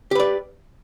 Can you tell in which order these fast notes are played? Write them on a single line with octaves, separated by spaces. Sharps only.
G4 B4 D5